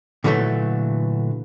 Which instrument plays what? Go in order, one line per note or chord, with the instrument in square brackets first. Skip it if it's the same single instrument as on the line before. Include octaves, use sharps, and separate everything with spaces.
[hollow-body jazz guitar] A#2 D3 E3 F#3 G3 A3